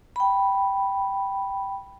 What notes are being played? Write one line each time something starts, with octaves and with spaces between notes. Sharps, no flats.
G5 B5